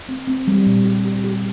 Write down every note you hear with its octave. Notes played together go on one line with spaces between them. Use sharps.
C4
C4
G3
A#2
G4
G4
G4